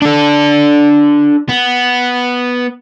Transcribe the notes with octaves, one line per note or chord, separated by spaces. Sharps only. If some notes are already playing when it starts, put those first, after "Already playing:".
D4 A4
B3